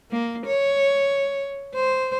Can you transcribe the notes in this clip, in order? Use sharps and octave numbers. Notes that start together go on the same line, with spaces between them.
A#3
C#5
C5